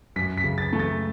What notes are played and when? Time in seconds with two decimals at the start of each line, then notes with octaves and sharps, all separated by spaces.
0.16 F#2 B6
0.37 B6
0.44 C#3
0.58 A6
0.73 A3
0.79 A6